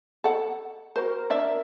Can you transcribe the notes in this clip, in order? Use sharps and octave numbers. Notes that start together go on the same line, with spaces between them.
A4 F#5
F#4 A#4 C5
D4 D5 E5